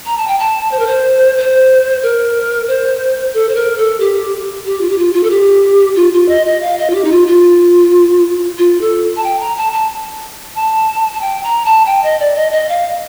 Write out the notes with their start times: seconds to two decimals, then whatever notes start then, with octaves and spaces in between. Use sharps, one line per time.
0.06 A#5
0.17 A5
0.27 G5
0.39 A5
0.72 C5
0.79 A#4
0.86 C5
1.38 C5
2.03 A#4
2.68 C5
3.34 A4
3.49 C5
3.55 A#4
3.78 A4
4.00 G4
4.66 G4
4.81 F4
4.90 G4
4.98 F4
5.14 F4
5.23 A4
5.30 G4
5.96 F4
6.13 F4
6.28 D#5
6.46 D#5
6.62 F5
6.78 D#5
6.90 F4
6.95 G4
7.04 D#4
7.11 F4
7.27 F4
8.58 F4
8.81 A4
9.16 A5
9.24 G5
9.40 A#5
9.57 A5
9.73 A5
10.55 A5
11.13 A5
11.21 G5
11.43 A#5
11.65 A5
11.86 G5
12.03 D#5
12.20 D5
12.35 D#5
12.52 D#5
12.69 F5